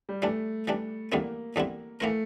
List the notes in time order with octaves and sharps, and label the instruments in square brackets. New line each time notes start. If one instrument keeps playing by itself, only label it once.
[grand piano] G3
[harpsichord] E3 G3 D4 [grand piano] A3
[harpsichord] E3 G3 D4
[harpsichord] E2 D3 G3 C4 E4 [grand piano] A#3
[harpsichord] E2 D3 G3 C4 E4
[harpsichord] E3 A#3 E4 A#4 [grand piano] A3